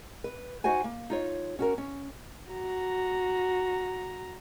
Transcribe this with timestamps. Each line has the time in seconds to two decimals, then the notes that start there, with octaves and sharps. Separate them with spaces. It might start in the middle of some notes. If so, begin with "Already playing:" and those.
0.24 B4
0.64 D#4 F#4 C5 F#5 G#5
0.84 A#3
1.10 D#4 F4 C#5
1.59 C#4 F#4 A#4
1.78 C#4
2.52 F#4 A#5